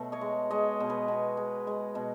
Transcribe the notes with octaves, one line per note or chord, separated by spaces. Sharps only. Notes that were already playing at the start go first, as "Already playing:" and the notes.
Already playing: B2 F#3 A3
C#5 D#5
G#3
G#3 C#5 D#5
B2
B4 C#5
B2
G#3
G#3
B2